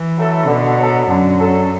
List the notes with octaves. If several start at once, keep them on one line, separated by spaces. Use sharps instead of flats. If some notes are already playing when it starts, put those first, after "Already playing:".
Already playing: E3
F#3 A3 E4 A4
B2 D3
F#3 D4 A4
F#2 D3
F#3 D4 A4